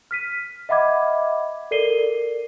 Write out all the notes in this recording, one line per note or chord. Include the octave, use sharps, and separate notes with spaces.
F6 B6 D#7
D#5 E5 F#5 B5 D6 G#6
A4 A#4 D5 C7 D#7 G7